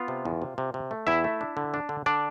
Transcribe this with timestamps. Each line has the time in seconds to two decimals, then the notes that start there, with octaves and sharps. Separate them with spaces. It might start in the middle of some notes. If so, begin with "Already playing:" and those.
Already playing: B3 F4 F5
0.08 C3
0.25 E2
0.42 C3
0.58 C3
0.74 C3
0.91 A3
1.07 E2 E4 E5
1.24 A3
1.41 D4
1.57 D3
1.74 D4
1.89 D3
2.06 D3 D4 D5